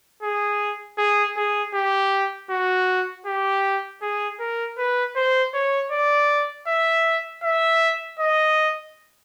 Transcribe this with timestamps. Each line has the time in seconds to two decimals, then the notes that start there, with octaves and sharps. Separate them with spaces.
0.22 G#4
0.98 G#4
1.37 G#4
1.74 G4
2.50 F#4
3.26 G4
4.02 G#4
4.40 A#4
4.78 B4
5.16 C5
5.54 C#5
5.92 D5
6.67 E5
7.44 E5
8.19 D#5